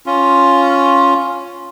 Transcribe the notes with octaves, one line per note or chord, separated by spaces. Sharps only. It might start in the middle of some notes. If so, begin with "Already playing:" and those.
C#4 F4